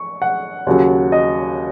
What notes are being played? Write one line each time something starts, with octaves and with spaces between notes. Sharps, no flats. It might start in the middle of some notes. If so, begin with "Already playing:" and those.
Already playing: C#6
F#5
D#2 C#3 F#3
D#5